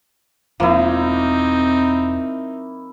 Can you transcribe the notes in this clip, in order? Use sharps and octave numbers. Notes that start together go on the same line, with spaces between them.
E1 F3 A#3 C4 D#4 E4